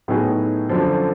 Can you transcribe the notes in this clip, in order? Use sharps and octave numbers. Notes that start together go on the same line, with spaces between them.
A2 F#3 B3 D#4 G#4
F#2 D3 F3